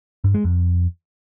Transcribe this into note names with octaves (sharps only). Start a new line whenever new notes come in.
G2
G#3
F2